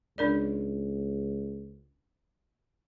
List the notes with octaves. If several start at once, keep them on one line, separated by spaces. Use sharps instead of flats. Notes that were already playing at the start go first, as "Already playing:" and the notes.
C#2 D4 A#4 D5